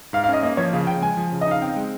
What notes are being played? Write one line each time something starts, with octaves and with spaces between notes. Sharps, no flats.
G#2 F5
F5
C#4 D#5
A#3 D#5
F3 C#5
C#3 F5
C#3 G5
G#3 G#5
F3
C#3
D#5
D#4 F5
C4 G5
G#3